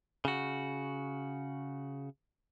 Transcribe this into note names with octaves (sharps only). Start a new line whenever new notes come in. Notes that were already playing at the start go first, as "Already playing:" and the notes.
C#3 F#4